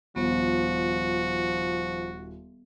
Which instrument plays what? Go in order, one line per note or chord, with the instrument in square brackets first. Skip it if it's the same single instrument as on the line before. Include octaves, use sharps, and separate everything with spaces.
[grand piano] D#1 [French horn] F3 [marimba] B3 [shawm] F#4